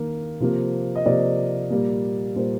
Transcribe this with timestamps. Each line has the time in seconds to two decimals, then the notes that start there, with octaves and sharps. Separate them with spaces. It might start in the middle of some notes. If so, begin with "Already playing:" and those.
Already playing: D#3 A#3
0.40 C3 F3 A#3
0.95 D#5
1.05 C3 F3 A#3 D5
1.70 A#2 G3 A#3
2.36 A#2 G3 A#3 C5